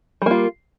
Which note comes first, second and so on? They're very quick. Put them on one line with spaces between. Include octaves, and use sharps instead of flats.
G3 A#3 F4